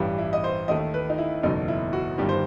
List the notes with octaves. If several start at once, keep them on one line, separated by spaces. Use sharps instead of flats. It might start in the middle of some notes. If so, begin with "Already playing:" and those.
Already playing: A1 G2 E3 G3
E4
D#5
C5
D#2 D#3 A3 D#5
B4
D#4
E4
F#1 E2 B2 F#3 A3 D#4
E4
F#4
G1 G2 D#3 G3 G4
C5